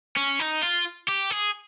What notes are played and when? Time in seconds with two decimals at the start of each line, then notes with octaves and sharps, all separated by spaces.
0.16 C#4
0.39 D#4
0.62 F4
1.08 G4
1.31 G#4